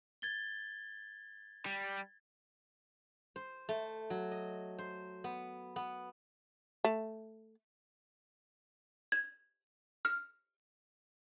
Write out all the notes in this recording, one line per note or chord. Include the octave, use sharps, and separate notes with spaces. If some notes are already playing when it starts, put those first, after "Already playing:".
G#6 A6 G7
G3
C5
A3
F#3
D#5
C5
B3
B3
A3
G#6
F6